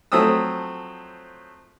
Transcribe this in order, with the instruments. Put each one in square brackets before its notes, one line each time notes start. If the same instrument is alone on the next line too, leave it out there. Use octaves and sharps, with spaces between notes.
[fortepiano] F3 F#3 A3 C4 D#6 E6